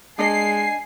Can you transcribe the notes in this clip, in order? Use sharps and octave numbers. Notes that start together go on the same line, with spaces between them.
G#3 D4 D#5 G#5 C7